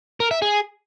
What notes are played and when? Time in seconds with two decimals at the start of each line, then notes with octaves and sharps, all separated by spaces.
0.20 A#4
0.31 E5
0.42 G#4